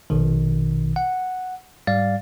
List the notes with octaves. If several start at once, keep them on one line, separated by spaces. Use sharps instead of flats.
A#1 B2 D#3
F#5
G#2 G3 D5 F5 A6